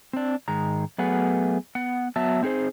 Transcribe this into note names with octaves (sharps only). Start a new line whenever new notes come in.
C4 D4
G#2 D#3 G#3 A#5
F#3 A3 B3 G#4 B4 F#5
B3 F#5
F#3 B3 E5 A5
C4 D#4 G#4 A4 C5